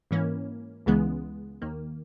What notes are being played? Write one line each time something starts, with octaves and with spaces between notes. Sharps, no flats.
G#2 E3 A#3 C#4
C#2 C#3 E3 G#3 B3
D#2 D#3 A#3